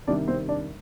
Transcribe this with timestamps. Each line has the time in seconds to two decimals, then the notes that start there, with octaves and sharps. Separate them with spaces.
0.07 C3 D#3 G3 D4 D5
0.28 C4 C5
0.49 D4 D5